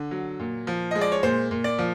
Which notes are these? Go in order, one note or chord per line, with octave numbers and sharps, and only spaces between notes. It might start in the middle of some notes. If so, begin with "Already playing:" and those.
Already playing: D3
F#3
A#2
F3
G#3 D#5
D5
C#5
A#2 C5
A#2
D5
F3